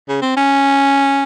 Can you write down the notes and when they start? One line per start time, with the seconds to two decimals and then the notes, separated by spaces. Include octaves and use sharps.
0.09 C#3
0.22 C4
0.37 C#4